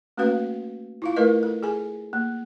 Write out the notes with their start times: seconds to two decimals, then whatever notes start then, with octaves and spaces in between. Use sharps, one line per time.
0.17 A3 A#3 C#4 F#4 B4 F5
1.02 E4 F4 F5
1.16 A3 E4 A#4 B4 D#5
1.43 A4
1.63 G#4 A4 G#5
2.13 A#3